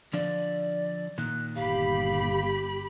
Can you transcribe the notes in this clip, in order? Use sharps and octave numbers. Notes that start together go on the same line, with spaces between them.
D3 F3 D4 D5
A#2 D#3 F#6
G1 G4 F5 B5